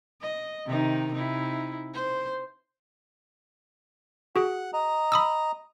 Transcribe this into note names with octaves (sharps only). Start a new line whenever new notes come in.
D#5
C3 D#3 D#4
C3 D#4 E4
C5
F#4 G#4 F#5
D#5 A#5
B5 D#6 E6